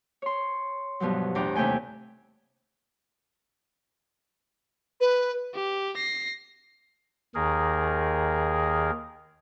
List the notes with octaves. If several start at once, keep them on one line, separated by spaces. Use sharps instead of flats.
C#5 C6
G2 B2 F3 F#3
E2 A2 D4 G5 A#5 D6
D#2 C3 A3 G5 G#5
B4
G4
A#6 C7
D#2 D#3 G#4 A#4